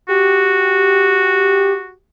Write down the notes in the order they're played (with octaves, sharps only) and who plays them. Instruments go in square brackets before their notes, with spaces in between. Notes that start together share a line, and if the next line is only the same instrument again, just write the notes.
[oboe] F#4 [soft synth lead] G4